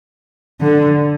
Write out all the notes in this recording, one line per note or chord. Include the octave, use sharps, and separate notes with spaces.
D3